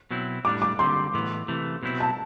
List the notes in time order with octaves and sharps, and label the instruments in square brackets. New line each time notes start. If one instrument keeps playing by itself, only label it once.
[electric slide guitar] B2 F#3 C4 E4
[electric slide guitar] A2 G3 D4 [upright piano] D6
[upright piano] D6
[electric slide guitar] D3 G3 C4 [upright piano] C6
[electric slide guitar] A2 E3 B3
C3 E3 A3
B2 F#3 C4 E4
[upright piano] A5